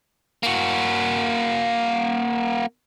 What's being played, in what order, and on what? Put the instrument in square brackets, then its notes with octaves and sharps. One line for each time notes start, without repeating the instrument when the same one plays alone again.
[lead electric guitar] A#3 F#4